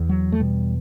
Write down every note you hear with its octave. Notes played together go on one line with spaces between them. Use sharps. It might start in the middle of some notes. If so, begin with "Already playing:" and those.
Already playing: E2
F#3
A3
B2 G3